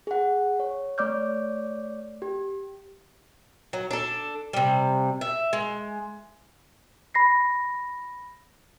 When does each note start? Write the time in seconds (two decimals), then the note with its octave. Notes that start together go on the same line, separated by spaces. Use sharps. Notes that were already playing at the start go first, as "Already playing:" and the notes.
0.07 G#4 F#5
0.60 C#5
0.98 A3 C#5 D5 D6 F6 G6
2.22 G4
3.73 F#3
3.91 D4 A4
4.53 C3 G3
5.21 E5
5.53 G#3
7.14 B5 A#6 C7